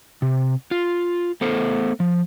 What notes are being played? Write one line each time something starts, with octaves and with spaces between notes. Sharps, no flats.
C3
F4
A3 B3 A4 C5
F3